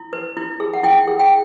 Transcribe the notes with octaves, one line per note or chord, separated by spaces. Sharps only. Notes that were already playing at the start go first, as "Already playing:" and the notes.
Already playing: E4
B4
E4
G#4
F#5
E4 G5
G#4
G5